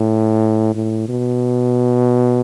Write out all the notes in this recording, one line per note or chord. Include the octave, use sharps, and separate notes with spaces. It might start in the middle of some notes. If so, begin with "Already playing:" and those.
Already playing: A2
A2
B2